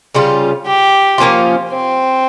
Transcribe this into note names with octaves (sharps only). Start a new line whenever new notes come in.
C#3 G3 C#4 F4
G4
F3 A#3 C#4 F4
C4